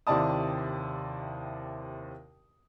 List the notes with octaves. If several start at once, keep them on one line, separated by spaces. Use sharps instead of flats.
D#2 C3 E4 D5 A5 D#6